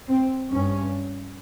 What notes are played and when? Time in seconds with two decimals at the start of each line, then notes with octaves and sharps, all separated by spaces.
0.09 C4
0.51 G2 C#4